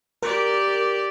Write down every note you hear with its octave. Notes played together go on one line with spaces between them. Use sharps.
G4 A#4 D5